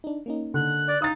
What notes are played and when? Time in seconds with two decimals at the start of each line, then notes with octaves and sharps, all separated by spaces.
0.04 D4 D#4
0.26 A#3 C#4 D#4
0.54 D3 F#6
0.87 D5
1.02 D#4 F5 D#6 A6